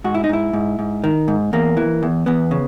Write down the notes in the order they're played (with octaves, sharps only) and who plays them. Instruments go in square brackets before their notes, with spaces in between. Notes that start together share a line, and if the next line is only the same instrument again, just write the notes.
[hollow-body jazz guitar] G#2 F#4
E4
D#4
G#2 E4
G#2
G#2
D#3
G#2
E2 A#3
E3
E2
E2 B3
C#3